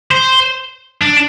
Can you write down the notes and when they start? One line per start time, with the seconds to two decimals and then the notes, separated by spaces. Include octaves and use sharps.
0.11 C5
1.02 D4